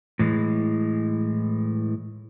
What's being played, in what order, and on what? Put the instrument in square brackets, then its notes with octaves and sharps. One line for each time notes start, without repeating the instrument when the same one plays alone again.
[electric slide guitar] A2 E3 G#3